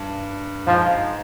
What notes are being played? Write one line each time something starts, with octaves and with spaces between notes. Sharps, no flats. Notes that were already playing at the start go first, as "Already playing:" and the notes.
Already playing: G2
G#2 F3